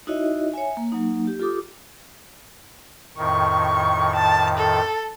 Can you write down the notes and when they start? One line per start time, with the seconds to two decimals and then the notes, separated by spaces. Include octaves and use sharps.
0.07 D#4 E4 F#4 C#5 D#5 E5
0.54 C#5 E5 G#5
0.77 A#3
0.92 F#3 A#3 D#4
1.27 G4
1.40 F4 G4 A4 D6 D#6
3.17 F2 A2 D#3 C#6
4.15 A5
4.58 A4